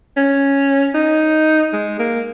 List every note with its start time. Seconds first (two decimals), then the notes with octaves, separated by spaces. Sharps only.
0.16 C#4
0.94 D#4
1.73 G#3
1.99 A#3